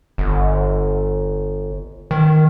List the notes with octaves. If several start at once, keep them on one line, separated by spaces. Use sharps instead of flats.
G1
D#3